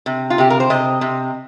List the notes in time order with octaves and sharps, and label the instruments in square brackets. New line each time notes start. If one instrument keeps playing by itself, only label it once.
[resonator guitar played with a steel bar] C3
F4
C3 G4
A#4
C5
C3 D#5
C3